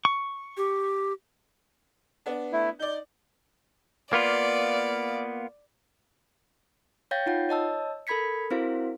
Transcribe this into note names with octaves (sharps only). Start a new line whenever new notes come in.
C#6
G4
B3 D4
A3 E4
D#4 D5 G6
A#3 B3 F4 D5
C#5 F5 G5 G6 A6 A#6
D#4 F4 F#5
C#5 D#5 A5 E6
A4 A#4 B5 G#6 B6 C#7
C4 E4 F#4 A#4 C5 F5